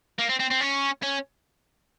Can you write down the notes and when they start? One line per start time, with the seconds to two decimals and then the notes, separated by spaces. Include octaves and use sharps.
0.19 A#3
0.30 C4
0.40 C4
0.51 C4
0.61 C#4
1.02 C#4